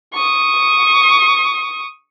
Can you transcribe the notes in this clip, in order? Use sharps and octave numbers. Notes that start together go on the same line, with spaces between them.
C#6 D#6